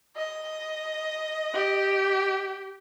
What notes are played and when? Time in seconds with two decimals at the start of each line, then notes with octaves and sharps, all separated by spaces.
0.16 D#5
1.54 G4